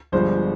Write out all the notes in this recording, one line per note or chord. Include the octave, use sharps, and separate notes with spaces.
G1 G2 F3 G#3 C5